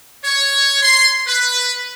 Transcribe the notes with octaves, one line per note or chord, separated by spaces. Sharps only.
C#5
C6
B4